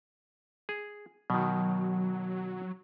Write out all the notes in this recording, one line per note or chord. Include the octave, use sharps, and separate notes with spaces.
G#4
B2 D#3 F#3